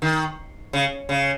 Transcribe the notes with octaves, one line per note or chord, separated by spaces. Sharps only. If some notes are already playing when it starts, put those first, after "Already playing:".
D#3
C#3
C#3